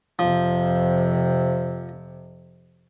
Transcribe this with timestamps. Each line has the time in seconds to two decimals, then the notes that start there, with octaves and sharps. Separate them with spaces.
0.19 F2 C3 F3